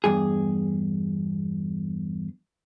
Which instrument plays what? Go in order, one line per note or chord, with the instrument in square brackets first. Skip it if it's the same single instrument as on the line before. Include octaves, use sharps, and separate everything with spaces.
[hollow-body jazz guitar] E2 G2 G#4